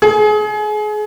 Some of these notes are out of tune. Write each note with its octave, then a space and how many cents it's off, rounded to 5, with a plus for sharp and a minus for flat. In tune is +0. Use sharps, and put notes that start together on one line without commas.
G#4 +30